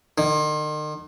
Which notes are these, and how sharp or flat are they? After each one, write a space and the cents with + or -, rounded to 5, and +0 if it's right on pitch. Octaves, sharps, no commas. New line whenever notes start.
D#3 -40